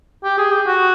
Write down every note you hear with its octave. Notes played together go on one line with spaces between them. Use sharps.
G4
G#4
G4
F#4